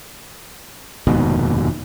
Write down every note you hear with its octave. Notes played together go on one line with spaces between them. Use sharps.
F1 D#2 G#2 B2